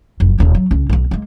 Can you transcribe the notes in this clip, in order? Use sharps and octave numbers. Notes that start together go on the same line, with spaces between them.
F#1 F2
D#1 B2
F#3
C#2 C#4
B1 B3
G#3 A#3